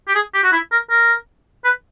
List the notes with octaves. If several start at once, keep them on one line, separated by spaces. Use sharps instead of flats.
G4
G#4
G4
F#4
E4
A#4
A#4
B4